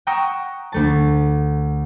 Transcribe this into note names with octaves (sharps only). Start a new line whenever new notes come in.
F#5 G5 A#5 C#6 D#6 E6
D2 A3 A5